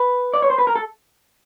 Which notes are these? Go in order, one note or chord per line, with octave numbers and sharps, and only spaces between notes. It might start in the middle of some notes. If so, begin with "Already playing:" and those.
Already playing: B4
D5
C#5
C5
B4
A#4
A4